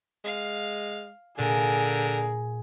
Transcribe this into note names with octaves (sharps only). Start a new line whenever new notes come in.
G#3 F5
A#2 D3 G#4 A#4